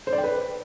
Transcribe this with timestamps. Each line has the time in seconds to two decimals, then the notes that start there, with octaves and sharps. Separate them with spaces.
0.07 C5
0.13 D5
0.18 G5
0.24 B4